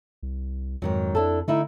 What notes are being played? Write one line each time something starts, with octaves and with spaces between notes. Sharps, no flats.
C2
F2 G#2 D#3 F#3
D4 E4 A4
D3 A3 D#4 E4